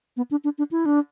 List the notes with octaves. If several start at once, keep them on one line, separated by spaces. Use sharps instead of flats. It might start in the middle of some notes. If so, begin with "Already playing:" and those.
B3
D4
D4
D4
E4
D4